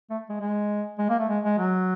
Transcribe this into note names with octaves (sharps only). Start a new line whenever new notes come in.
A3
G#3
G#3
G#3
A#3
A3
G#3
G#3
F#3